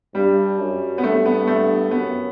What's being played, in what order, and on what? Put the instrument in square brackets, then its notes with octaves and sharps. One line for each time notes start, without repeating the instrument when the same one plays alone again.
[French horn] G2 [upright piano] G3
[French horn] F#2
[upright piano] B3
[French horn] G2 [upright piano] A3
[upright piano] B3
A3
[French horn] F#2 [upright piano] B3